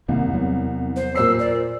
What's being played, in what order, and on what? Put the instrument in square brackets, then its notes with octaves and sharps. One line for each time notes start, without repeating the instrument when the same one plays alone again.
[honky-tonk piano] C2 [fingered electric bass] F2 D#3 A#3
[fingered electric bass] E2 F#3 B3
[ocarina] C5
[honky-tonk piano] A#2 C5 C7 [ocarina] E6
[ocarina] D5